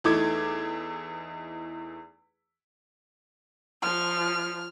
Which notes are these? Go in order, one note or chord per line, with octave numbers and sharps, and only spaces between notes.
E2 A3 D#4 E4 D6 G#6
F3 F6